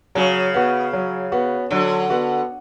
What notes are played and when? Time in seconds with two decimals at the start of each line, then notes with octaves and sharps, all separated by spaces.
0.15 C#3 F#3
0.54 B3 F#4
0.93 F#3
1.32 B3 F#4
1.71 D3 F#3
2.10 B3 F#4